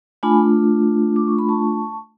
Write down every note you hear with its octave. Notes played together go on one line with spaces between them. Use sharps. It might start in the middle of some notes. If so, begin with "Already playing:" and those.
A3 D4 F4 G#5 B5
D6
C#6
B5
A5 C#6